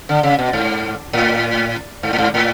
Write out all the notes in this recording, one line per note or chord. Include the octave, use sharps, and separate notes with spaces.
D3
C#3
B2
G#2
A2
G#2
A2
G#2
A2